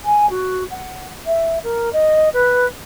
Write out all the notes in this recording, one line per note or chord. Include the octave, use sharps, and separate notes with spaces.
G#5
F#4
F#5
E5
A#4
D#5
B4